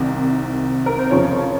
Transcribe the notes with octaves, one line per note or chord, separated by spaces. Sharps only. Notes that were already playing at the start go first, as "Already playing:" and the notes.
Already playing: C2 C3 D#3
A#4
C5
F2 C#3 F3 C#5